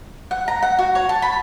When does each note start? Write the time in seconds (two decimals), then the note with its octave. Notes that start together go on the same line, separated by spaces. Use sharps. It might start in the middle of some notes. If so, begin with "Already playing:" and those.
0.31 F#5
0.48 A#5
0.62 F#5
0.79 F#4
0.95 C#5
1.09 A5
1.22 B5